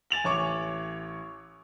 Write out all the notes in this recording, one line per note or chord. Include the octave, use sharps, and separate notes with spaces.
G#5 A6 F7 F#7
A1 C#5 C#6 D6